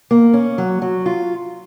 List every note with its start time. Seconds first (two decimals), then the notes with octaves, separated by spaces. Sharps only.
0.11 A#3
0.34 C#4
0.58 F#3
0.82 F#3
1.06 F4